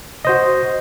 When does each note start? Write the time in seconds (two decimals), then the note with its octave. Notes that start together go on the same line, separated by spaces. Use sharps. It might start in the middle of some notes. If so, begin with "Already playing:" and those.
0.25 F#4 C5 D#5